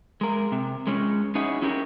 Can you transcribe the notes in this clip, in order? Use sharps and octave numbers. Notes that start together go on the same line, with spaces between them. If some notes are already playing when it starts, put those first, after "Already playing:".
G#3 A#4
C3
G#3 C#4
C#4 D#4 E4 F#4 G#4 C#5
C#4 E4 G4 A#4